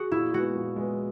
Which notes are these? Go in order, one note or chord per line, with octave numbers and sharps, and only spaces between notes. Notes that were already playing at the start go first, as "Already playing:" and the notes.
Already playing: F#4 G#4
A#2 E4
G#3 B3 F#4
A#2
G#3 B3